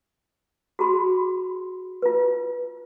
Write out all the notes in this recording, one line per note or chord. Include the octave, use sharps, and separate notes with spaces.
F#4 G#4 B5 C6
F4 B4